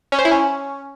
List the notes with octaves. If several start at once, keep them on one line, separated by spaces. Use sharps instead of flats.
C#4
C5
E4
C#4